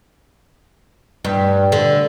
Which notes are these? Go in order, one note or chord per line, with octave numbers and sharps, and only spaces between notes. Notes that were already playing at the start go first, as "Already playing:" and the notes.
G2
D3